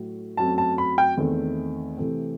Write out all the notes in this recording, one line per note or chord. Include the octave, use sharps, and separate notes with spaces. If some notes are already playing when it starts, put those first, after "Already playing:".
Already playing: A2 F#3 A3
F#2 F#3 A3 C4 A5
A5
B5
G5
E2 D#3 A3 C4
C3 E3 A3 C4